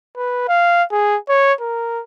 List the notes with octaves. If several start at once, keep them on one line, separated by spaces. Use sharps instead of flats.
B4
F5
G#4
C#5
A#4